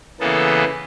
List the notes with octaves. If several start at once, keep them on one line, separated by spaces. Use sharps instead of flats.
C#3 E3 A#3 B3 A4